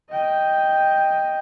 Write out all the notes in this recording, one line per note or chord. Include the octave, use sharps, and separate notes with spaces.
D#5 G5